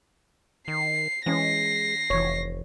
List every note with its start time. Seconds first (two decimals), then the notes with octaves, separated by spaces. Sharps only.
0.68 D#3 C7
1.26 E3 G#3 C#4 A#6 C7
2.10 F1 E3 C#5